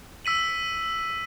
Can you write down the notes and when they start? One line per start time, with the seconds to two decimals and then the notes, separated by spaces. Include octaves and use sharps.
0.25 E6 B6 D#7 F#7